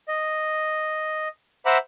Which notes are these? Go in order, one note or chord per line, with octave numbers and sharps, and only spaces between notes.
D#5
C5 E5 F#5 A#5 B5 D6